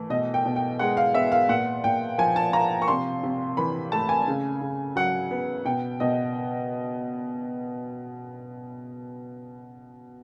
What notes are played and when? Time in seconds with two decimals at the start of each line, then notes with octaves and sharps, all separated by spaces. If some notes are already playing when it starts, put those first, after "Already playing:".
Already playing: E3 A3
0.10 B2 D#5
0.34 G5
0.46 B2
0.56 G5
0.79 G#3 F#5
0.97 F5
1.14 B3 E5
1.32 F5
1.49 A#2 F#5
1.84 A#2 G5
2.18 F3 G#5
2.36 A5
2.53 A#3 A#5
2.82 C#6
2.88 C3 C6
3.23 C3
3.57 E3 B5
3.92 A3 A5
4.09 G#5
4.27 C#3
4.61 C#3
4.96 F#3 F#5
5.31 B3
5.65 B2 G5
6.00 B2 D#5